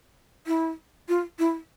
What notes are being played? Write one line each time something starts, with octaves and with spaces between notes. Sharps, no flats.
E4
F4
E4